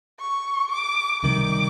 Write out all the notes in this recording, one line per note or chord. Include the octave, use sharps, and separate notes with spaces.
C#6
D6
C#2 C3 D#3 G3 D6